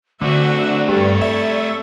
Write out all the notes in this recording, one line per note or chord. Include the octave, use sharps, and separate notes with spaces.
D3 A3 C4 F#4 D5 E5
G2 A4 C#5
D5 E5